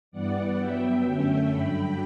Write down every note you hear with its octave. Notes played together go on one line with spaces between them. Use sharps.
G2 E3 G3 B3 D5 F#5
G2 F#3 B3 E5 G5
F#2 D3 A3 C#4
G2 D3 F#3 G5 B5